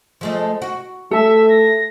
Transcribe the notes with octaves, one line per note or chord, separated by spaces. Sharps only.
F3 G#3 A3
F#4
A3 A4 E5 A5
A#6